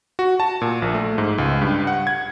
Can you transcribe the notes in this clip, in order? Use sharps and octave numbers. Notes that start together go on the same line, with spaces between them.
F#4
A5
A#2
A#1
A3
G#2
C#2
G2
F#5
G#6